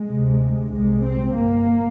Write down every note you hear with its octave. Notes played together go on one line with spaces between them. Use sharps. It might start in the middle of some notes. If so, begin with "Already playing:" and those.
Already playing: G#3
D2 C3
C2 C3 G#3
C4
G1 G2 A#3